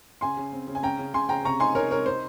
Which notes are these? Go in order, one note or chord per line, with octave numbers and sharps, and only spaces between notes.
C#3 G#5 C6
C#3
C4
C#3
G#5
C#4 G5 A#5
C#3
C#3 G#5 C6
C#3 G5 A#5
C3 A#5 C#6
D#4 G#5 C6
D#4 A#4 C#5
C3 A#4 C#5
D#4 C5